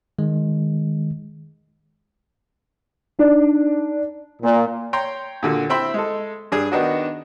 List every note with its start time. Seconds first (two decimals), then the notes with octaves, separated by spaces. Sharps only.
0.19 D#3 G#3
3.19 D4 D#4
4.41 A#2
4.93 C#5 G5 A#5 C6
5.43 A#2 D3 F#4
5.70 C4 E4 E5 G5 B5 C6
5.94 G#3 A4
6.52 G2 D4 G#4
6.72 D#3 B3 D4 D#4 F#4